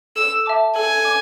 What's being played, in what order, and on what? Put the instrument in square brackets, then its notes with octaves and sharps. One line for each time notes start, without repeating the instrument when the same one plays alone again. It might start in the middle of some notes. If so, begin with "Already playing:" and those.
[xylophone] A4 [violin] E6
[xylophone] E5 A5 D6
[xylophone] A4 [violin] G#5
[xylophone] D6